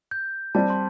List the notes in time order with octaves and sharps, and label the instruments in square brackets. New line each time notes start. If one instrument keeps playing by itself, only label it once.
[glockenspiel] G6
[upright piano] G3 C4 G4 D5 [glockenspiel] A5
[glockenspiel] C6